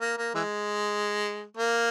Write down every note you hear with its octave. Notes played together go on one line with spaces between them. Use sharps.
A#3
A#3
E3 G#3
A#3